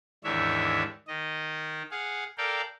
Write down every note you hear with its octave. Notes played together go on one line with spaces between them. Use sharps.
D#2 G#2 E3 D4 C#5 E5
D#3 D#5
G#4 F5 F#5
A4 A#4 D5 F5 G5